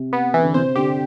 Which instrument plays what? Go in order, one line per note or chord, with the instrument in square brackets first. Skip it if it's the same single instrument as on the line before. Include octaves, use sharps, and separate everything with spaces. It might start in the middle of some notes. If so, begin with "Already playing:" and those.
Already playing: [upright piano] C3
[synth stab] B3
E3
[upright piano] D3
[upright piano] C3 [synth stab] C5
[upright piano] D3 [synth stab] G4